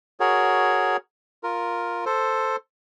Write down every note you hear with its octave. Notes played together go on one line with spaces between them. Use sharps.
F#4 G#4 A#4 C#5
F4 A#4
A4 C5